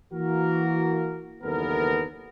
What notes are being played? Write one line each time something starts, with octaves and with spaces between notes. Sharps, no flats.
E3 A#3 F#4 A#4
F#1 D#2 E3 B3 A4 A#4